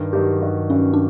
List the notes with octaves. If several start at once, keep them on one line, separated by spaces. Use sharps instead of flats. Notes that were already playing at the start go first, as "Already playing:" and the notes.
Already playing: G2 D#3
G2 D#3 F#3 G4
G2 D#3 F#3
G2 D#3 F#3 C#4
D4